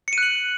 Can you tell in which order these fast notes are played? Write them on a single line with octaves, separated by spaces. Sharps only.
C#7 D#7 F#6 F#7